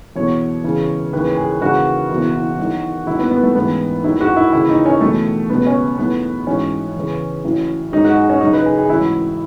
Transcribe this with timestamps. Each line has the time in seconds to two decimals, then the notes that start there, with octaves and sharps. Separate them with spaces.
0.16 E2 B2 F#3 C#5
0.64 E1 E2 C#3 E3
1.13 D#2 C#3 E3 B4
1.37 G#4
1.61 D#2 C#3 E3 F#4
2.09 F#1 E2 B2 F#3
2.58 E2 D#3 F#3
3.07 D#2 D#3 F#3 E4
3.19 B3
3.31 B3
3.43 A3
3.55 A1 G#2 E3 B3
4.04 D#2 D#3 F#3 E4
4.21 F#4
4.36 E4
4.53 D#2 C#3 E3 E4
4.69 D#4
4.86 C#4
5.01 E2 B2 F#3 A3
5.50 C#2 B2 F#3 B3
5.67 C#4
5.98 B1 A2 E3 B3
6.47 A1 G#2 F#3 C#4
6.96 E2 C#3 E3
7.45 A1 A2 F#3
7.92 G#1 G#2 F#3 D#4
8.05 F#4
8.16 G#4
8.30 C#4
8.41 F#1 F#2 C#3 F#3 D#4
8.53 B4
8.66 G#4
8.78 G#4
8.89 A1 G#2 F#3 E4